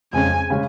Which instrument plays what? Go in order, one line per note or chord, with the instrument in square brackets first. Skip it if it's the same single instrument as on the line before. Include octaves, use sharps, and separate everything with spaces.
[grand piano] F2 C#3 G#3 C#4 [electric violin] G#5
[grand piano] C#3 G#3 C#4